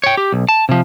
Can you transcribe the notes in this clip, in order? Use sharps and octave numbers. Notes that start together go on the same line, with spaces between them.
C#5 G5
G4
B1
A5
C3 F3